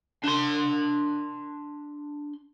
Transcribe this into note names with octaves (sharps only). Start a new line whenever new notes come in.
D4 C6